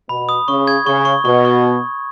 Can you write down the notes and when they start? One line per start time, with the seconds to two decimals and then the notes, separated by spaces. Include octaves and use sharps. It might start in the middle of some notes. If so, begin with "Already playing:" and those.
0.09 B2 B5
0.29 D#6
0.48 C#3 C#6
0.67 G#6
0.86 C#3 C#6
1.05 C#6
1.25 B2 C#6
1.45 C#6